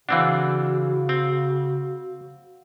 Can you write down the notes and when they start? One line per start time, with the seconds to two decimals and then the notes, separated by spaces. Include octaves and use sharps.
0.09 C#3 E3 C4 D4 F#4 F5 F#5
1.09 C4